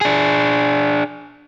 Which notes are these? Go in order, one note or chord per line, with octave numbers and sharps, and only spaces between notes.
D4 G#4